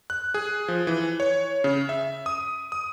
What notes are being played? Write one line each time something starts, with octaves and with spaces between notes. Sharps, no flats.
F#6
G#4
F3
E3
C#5
C#3
E5
D#6
D#6